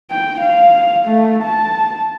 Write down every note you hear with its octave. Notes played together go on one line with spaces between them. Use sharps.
G5
F5
A3
A5